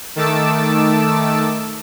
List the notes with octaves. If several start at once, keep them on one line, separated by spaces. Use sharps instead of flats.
D#3 A3 A5 D6 E6